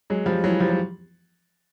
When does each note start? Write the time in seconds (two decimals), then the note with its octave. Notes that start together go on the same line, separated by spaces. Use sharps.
0.10 F#3 G#3
0.26 F3 G3
0.44 E3 F#3
0.60 F3 G3
0.70 F#3